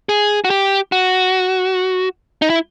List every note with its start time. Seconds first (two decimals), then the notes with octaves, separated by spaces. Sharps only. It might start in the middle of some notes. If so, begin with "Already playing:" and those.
0.09 G#4
0.45 F#4
0.50 G4
0.92 F#4
2.42 D#4
2.50 E4